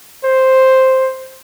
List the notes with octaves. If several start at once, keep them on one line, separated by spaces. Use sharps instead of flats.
C5